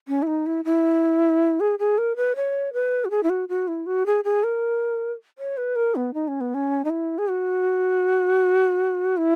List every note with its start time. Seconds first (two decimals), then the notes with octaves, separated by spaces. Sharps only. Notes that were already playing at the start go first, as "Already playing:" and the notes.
0.08 C#4
0.22 E4
0.27 D#4
0.46 E4
0.65 E4
1.60 G#4
1.79 G#4
1.98 A#4
2.16 B4
2.36 C#5
2.73 B4
3.05 F#4
3.10 G#4
3.23 E4
3.30 F#4
3.49 F#4
3.68 E4
3.86 F#4
4.06 G#4
4.24 G#4
4.43 A#4
5.38 C#5
5.57 B4
5.76 A#4
5.95 B3
6.14 D#4
6.28 C#4
6.41 B3
6.54 C#4
6.85 D#4
6.90 E4
7.18 G#4
7.28 F#4
9.17 E4